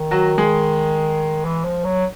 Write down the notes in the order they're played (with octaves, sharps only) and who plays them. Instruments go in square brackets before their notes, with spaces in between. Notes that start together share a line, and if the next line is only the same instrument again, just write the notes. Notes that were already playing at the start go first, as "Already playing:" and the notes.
Already playing: [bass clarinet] D#3
[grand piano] F#3 F#4
G#3 G#4
[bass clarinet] E3
F3
F#3